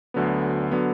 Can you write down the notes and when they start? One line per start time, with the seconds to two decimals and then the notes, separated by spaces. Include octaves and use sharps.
0.14 D2 D3 F#3 B3
0.72 D3 F#3 B3